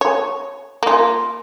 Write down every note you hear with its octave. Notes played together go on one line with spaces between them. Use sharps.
C#5
A#3 F4